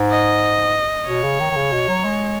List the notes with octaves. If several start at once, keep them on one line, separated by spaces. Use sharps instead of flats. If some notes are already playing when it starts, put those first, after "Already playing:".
Already playing: G#2
D#5
B2 C#5
C#3
D#3
D#3
C#3
B2
F#3
G#3